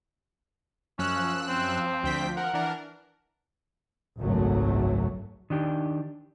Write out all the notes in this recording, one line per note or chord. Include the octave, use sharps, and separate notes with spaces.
F#2 F3 C#4 E6 F#6
C4
D2 G5 B6
A#4 F#5
E3 D4 A#4
G#1 C#2 F#2 F#3 A3
D#3 D4 G4